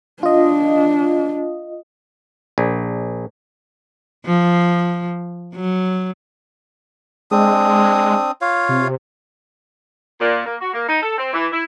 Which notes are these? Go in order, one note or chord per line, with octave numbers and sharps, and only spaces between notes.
D4 F4 D#5
A#1
F3
F#3
G#3 C4 D4 D#6
F4 C#5 F5
C3
A#2
A#3
F#4
A#3
D#4
A4
C4
E3
E4